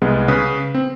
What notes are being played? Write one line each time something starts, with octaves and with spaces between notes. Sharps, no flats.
C2 G#3 B3
C#3 B4 D#6
C4